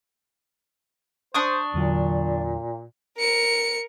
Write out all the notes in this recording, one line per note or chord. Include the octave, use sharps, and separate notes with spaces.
D4 C5 C#6 D#6
E2 A#2 D3 F#3
A#4 C#7